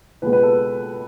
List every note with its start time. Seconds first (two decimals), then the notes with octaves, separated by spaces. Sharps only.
0.22 C#2 B2 G#3 B4
0.33 B4
0.43 A4